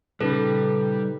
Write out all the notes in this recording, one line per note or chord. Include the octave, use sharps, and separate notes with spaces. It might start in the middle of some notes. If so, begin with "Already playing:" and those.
A#2 C#3 G3 D#4 A4 B4